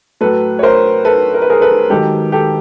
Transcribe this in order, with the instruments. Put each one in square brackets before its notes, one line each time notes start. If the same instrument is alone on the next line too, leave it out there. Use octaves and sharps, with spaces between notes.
[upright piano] A2 F#3 A4 B4
C#5
A#4 C5
A4 B4
A#4
B4
G#4 A#4
A4 B4
G#2 D#3 F#3 G4 A4
G4 A4